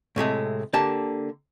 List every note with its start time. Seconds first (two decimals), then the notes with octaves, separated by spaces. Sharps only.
0.16 A2 C3 G#3 A3
0.73 D3 A#3 G4 A5